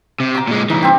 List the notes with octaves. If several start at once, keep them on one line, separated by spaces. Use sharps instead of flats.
C3
A#5 D6
A#2 G#3
C2 E3 D#4
C4 G4